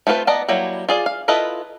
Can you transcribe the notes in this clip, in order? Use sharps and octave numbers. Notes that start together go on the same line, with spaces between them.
A3 C4 F4 G#4 B4
B3 D5 D#5 A5 A#5
F#3 G3 A#3 E4
F4 G#4 D5
F5
E4 F4 A4 B4 D#5